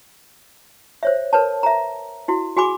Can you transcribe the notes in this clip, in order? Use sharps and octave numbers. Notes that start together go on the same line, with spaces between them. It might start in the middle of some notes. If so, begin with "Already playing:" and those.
C5 C#5 E5
A#4 B4 C#5 A5
E5 A#5
E4 F#4
F#4 G#4 G#5 B5 D6